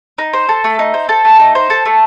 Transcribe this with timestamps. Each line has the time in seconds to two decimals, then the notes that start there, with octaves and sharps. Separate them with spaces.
0.18 D#4
0.34 C5
0.49 A4
0.64 A3
0.79 D#4
0.94 C5
1.09 A4
1.25 A3
1.40 D#4
1.55 C5
1.70 A4
1.85 A3